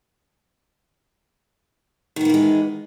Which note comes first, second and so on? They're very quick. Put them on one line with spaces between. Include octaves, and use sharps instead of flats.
D#3 B3 A#3 E3 G#3